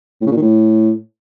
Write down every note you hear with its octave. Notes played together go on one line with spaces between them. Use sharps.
A2
C#3
A#2
D#3
A2